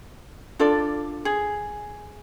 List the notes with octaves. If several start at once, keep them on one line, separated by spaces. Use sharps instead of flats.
D4 F4 A4 D5
G#4